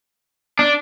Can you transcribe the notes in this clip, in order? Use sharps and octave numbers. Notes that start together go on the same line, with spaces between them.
D4